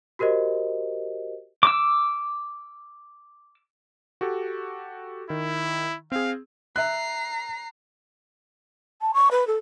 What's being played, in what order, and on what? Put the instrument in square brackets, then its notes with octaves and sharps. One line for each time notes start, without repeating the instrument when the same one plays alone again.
[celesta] F#4 G4 A#4 C5 D#5
[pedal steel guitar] D6 E6
[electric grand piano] F#4 G4 A4
[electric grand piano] D#3 [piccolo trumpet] E4
[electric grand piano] C4 G#4 [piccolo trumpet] F5
[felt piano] E5 F#6 [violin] A#5 C7
[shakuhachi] A5
C#6
B4
A4